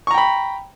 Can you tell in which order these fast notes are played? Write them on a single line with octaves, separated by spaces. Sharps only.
C#6 A#5 G5 B5